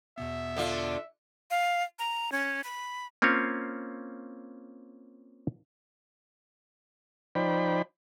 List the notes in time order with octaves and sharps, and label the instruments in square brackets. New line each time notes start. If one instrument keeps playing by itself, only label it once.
[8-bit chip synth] E2 B2 B3 [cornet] E5
[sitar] D3 D4 F4
[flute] F5
A#5
C#4
B5
[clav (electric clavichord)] A#3 C4 C#4 F4 C#5
[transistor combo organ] F3 D#4 C5 D5 G5 B5